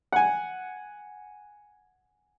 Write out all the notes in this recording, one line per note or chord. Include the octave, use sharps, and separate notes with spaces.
F#5 G#5